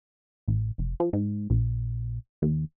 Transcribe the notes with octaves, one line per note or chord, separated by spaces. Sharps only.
A1
F1
F3
G#2
A#1
D#2